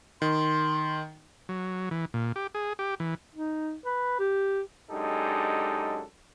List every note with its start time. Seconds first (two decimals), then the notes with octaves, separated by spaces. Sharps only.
0.22 D#3 C6
1.49 F#3
1.91 E3
2.14 A#2
2.36 G4
2.55 G#4
2.79 G4
3.00 E3
3.34 D#4
3.85 B4
4.19 G4
4.91 F#2 G#3 D4 D#4 G4 A4